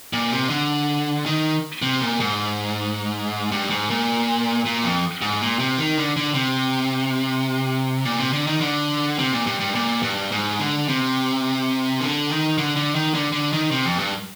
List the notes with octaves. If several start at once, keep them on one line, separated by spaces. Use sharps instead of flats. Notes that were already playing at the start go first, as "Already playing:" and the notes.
A#2
C3
D3
D#3
C3
A#2
G#2
G2
G#2
A#2
A#2
F2
G#2
A#2
C3
D#3
D3
D3
C3
A#2
C3
D3
D#3
D3
C3
A#2
G2
G2
A#2
G2
G#2
D3
C3
D3
D#3
D3
D3
D#3
D3
D3
D#3
C3
F2
G2